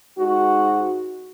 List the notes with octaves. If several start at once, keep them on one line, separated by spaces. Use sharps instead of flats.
G#2 F#4